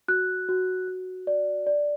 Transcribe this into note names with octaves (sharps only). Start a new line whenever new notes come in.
F#4 F#6
F#4
F#4
D5
D5